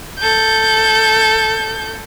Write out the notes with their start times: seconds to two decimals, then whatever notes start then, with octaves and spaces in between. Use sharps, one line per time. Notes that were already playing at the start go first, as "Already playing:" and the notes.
0.19 A4 G6